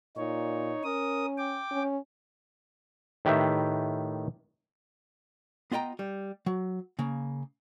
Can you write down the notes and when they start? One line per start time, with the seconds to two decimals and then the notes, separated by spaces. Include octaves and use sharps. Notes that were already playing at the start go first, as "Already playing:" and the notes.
0.17 A#2 D#4 C#5
0.84 C#4 A#4 D#6
1.38 G5 D6
1.71 C#4
3.25 A2 D#3 G4 B4 E5
5.72 B3 F4 D#5 G5 A#5
5.99 G3
6.46 F#3
6.99 C#3 A#3